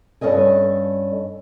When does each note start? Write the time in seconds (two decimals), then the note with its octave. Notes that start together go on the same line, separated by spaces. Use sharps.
0.21 G2 C#4 A4 D#5 G#5